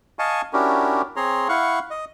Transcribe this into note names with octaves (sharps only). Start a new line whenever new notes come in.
D#5 F5 G#5 A5 C#6
C#4 D4 E4 F#4 G4 A#4
C4 G#4 C#5 A#5 C6
E4 F5 F#5 C#6
D#5